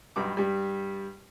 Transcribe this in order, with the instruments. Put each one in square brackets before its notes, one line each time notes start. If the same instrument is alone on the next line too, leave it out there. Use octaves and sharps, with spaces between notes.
[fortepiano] B1 G2 D6
G2 G3